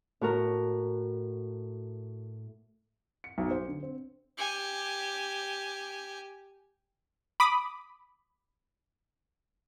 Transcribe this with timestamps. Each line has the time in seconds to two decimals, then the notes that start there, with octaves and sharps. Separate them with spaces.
0.21 A2 F#4 A#4
3.24 C#7
3.38 B1
3.51 C5
3.68 D3
3.83 C4
4.38 G4 G#5
7.40 B5 D6 D#6